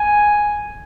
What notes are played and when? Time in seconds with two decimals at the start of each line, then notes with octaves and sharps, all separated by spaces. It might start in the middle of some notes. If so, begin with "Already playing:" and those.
Already playing: G#5